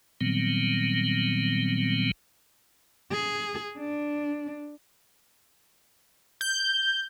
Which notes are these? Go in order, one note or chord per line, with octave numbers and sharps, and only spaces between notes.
A#2 D#3 F#3 G3 B3 C4
G#4
D4
G6